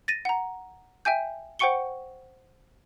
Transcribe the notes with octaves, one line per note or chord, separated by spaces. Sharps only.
A6 A#6 D#7
F#5 A#5
E5 G5 G#5 G6
C5 F#5 G5 C#6 C#7 G7